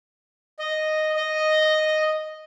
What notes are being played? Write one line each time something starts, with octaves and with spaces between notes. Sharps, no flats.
D#5
D#5